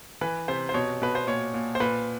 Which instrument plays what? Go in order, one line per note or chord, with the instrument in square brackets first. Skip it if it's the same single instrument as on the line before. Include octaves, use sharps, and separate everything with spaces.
[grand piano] E3 B4
C3 C5
C5
B2 C#5
B2 B4
C5
A#2 C#5
A#2
C5
A#2 B4